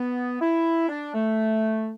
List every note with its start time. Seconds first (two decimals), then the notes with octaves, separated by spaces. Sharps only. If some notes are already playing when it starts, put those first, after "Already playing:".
Already playing: B3
0.41 E4
0.89 D4
1.14 A3